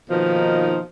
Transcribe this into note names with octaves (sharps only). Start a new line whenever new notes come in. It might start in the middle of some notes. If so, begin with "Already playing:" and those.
B2 D#3 F3 A#3 B3 D#4